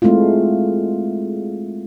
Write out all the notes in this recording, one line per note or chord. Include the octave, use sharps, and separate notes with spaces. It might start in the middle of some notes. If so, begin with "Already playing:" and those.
G#3 A3 C4 E4 F4